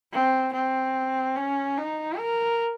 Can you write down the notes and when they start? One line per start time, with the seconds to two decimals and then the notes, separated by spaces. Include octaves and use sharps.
0.12 C4
0.53 C4
1.36 C#4
1.78 D#4
2.18 A#4